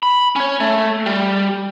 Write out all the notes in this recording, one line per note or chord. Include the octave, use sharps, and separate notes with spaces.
B5
C#4 C#5
A3
G3